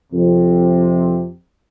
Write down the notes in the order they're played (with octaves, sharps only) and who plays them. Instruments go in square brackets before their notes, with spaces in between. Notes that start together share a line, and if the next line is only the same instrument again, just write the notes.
[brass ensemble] F2 C3